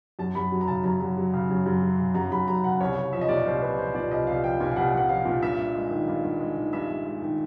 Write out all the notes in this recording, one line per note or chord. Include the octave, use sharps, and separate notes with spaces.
F#2 A5
F#2 B5
F#3
A#5
C#3 A5
F#2 A#5
F#2
F#3
C#3
F#2
F#2
F#3
C#3
F#2 A#5
F#2 B5
F#3 A#5
C#3 F#5
C2 C#5
C2
F3 E5
D#5
A#2 D5
C#5
C2 C5
C2 B4
F3 C5
A#2 D5
C2 D#5
C2 F5
F3 G5
A#2 G#5
F5
C2 F#5
C2 F#5
F3 F5
A#2
G2 E5
G2
G#3
D#3
G2
G2
G#3
D#3
G2 E5
G2
G#3
D#3